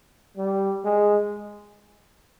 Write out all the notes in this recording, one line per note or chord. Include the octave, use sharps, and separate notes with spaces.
G3
G#3